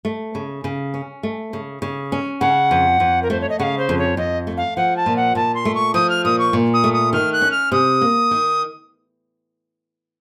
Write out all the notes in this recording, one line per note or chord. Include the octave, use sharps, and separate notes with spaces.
A3
C#3
C#3
C#4
A3
C#3
C#3
C#4
C#3 F#5
F2
F2
A#4
A3 C5
C#5
D#5
C#3 F5 F#5
C5
F2
C#5
F2 D#5
A3
F5
F3 F#5
A5
A#2
F#5
A#2 A5
C6
A3
C#6
F3 D#6
F6
A#2 D#6
C#6
A#2
D#6
A3
D#6
D#3 F6
F#6
C#4
F6
C3 D#6
A#3
D#3